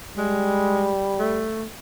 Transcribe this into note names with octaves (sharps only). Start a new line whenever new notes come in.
G3 G#3
A3